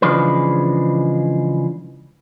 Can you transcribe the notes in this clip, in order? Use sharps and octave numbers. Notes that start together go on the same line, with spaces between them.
C#3 E3 F3 G#3 D4 B4